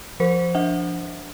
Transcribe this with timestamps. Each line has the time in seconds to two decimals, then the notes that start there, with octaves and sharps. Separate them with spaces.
0.20 F3 A#4 C5
0.55 D4 E5 F#5